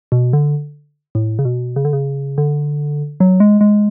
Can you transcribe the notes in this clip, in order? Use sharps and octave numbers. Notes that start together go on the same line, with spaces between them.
B2
D3
A2
C#3
B2
C#3
D3
C#3
D3
F#3
G#3
G#3